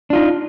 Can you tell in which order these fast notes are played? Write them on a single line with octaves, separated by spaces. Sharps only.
D4 F4 D#4